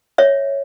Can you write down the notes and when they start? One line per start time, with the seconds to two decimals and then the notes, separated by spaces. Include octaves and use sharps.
0.18 C#5 E5